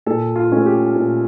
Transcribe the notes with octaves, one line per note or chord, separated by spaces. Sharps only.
A#2 A4
F4
A3 C#4
G4
A#2